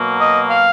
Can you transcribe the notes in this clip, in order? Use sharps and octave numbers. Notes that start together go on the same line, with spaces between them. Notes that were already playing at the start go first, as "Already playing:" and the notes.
Already playing: B2 F#3 A#3
D#5
F5